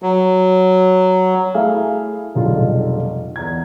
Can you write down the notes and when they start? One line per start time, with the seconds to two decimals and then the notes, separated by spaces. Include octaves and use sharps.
0.03 F#3
1.54 A3 E4 G#4 E5 F5
2.35 F1 B1 D3 G3 F4 G#4
3.36 E2 A#5 G#6